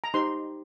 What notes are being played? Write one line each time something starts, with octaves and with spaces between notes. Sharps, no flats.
A#5
D#4 G4 C5 C6